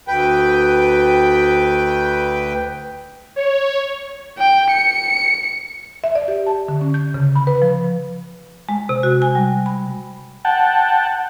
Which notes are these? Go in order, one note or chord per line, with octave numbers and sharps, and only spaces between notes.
D2 B4 G5
C#5
G5
C#7
E5
D5
G4
A5
D3
C#4
G6
C#3
B5
B4
F3
G#3
C3
F#4
G#5
G3
B5
F#5 G5 A5